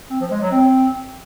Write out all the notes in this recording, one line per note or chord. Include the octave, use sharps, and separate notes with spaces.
C4
F3
G#3
F#3
C4